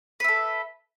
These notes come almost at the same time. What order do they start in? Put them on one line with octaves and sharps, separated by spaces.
B4 E5 A4